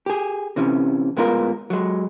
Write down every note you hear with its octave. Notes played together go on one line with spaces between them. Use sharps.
G4 G#4
C3 E3 C#4
A2 G#3 B3 E4 F4 A#4
F#3 G#3